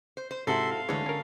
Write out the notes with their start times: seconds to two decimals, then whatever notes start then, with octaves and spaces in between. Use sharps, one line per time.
0.17 C5
0.31 C5
0.47 G#2 C3 E4 F#4 A4 E5 C6
0.70 F5
0.89 D2 D3 E3 G#3 C#5
1.06 C#4 A#4